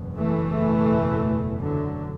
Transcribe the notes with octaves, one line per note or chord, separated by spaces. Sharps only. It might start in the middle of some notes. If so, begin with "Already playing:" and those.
Already playing: F#1 E2 B2
E3 A3
D3 F#3